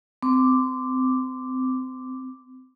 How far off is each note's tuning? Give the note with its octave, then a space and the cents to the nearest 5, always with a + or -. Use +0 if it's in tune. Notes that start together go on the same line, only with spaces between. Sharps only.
C4 -25 D6 +0